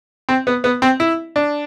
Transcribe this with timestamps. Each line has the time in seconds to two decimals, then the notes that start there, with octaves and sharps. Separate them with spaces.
0.29 C4
0.47 B3
0.64 B3
0.82 C4
1.00 E4
1.36 D4